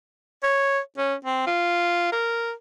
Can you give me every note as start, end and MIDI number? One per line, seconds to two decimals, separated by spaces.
0.43 0.79 73
0.97 1.15 61
1.25 1.44 60
1.47 2.12 65
2.12 2.52 70